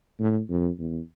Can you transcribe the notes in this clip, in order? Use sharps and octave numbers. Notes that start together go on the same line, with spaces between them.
A2
F2
E2